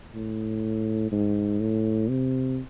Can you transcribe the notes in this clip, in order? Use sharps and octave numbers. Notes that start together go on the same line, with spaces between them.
A2
G#2
A2
C3